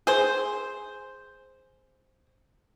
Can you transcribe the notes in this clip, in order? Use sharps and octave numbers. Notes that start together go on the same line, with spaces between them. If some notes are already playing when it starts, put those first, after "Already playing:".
G#4 C5